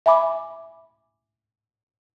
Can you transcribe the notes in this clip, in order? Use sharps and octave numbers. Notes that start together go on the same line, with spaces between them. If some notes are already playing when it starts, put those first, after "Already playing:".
E5 G#5 B5 D6